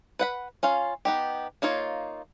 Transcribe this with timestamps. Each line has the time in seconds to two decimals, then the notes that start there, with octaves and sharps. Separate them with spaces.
0.19 B4 F#5 B5
0.63 C#4 F4 F5
1.05 B3 D#4 G4
1.62 A#3 D#4 F4 C#5